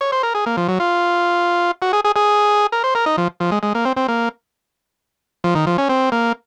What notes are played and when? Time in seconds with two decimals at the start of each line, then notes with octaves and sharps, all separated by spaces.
0.01 C#5
0.12 C5
0.23 A#4
0.35 G#4
0.46 A#3
0.57 F3
0.68 F#3
0.80 F4
1.82 F#4
1.93 G#4
2.04 G#4
2.16 G#4
2.72 A#4
2.84 C5
2.95 A#4
3.06 D#4
3.18 F3
3.40 F3
3.51 G#3
3.63 G#3
3.75 A#3
3.85 C4
3.97 C4
4.08 A#3
5.44 F3
5.55 D#3
5.67 F3
5.78 C#4
5.89 C4
6.12 A#3